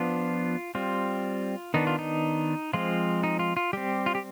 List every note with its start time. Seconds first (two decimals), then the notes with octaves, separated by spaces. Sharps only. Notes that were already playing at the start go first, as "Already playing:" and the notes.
Already playing: F3 B3 D4 F4
0.75 G3 C4 F4
1.74 D#3 B3 D4 D#4
1.87 F4
1.99 D#4
2.73 F3 G#3 C4 F4
3.23 D#4
3.39 F4
3.57 F4
3.73 G3 C4 G4
4.06 F4
4.15 G4